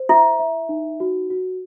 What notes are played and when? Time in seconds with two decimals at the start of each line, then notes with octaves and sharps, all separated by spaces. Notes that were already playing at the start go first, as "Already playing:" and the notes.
Already playing: C5
0.09 E4 E5
0.39 E5
0.69 D#4
1.00 F#4
1.30 F#4